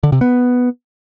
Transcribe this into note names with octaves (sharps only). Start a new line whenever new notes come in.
D3
C3
B3